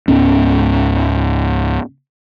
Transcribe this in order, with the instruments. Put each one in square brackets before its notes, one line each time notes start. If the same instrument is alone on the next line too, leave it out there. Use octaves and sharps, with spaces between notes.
[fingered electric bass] C#2 G#2 B3 C#4